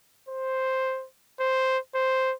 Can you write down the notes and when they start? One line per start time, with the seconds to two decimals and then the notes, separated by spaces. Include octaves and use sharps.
0.28 C5
1.40 C5
1.95 C5